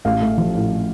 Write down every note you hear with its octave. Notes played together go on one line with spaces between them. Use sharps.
A1 F5
A3
F3
A2